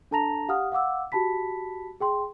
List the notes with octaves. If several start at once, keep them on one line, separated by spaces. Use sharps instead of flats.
D4 A4 A5 A#5 A#6 F7
G4 F5 F#5 D#6 F6
F5 F#5 D6 E6
F#4 G4 A5 B5 B6
G#4 G5 C6